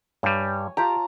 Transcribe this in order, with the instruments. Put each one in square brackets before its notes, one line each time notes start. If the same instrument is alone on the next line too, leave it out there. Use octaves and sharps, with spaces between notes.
[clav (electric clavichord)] G2 G3 [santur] C#5 G#5
[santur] F4 A5 A#5 [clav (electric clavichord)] G4